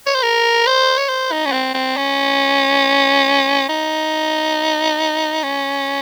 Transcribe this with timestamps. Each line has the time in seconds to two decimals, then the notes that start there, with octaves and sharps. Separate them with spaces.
0.06 C#5
0.15 C5
0.23 A#4
0.67 C5
0.98 C#5
1.09 C5
1.32 D#4
1.46 C#4
1.52 C4
1.74 C4
1.97 C#4
3.69 D#4
5.43 C#4